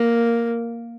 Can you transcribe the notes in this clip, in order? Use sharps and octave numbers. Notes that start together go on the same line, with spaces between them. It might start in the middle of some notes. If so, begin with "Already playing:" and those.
Already playing: A#3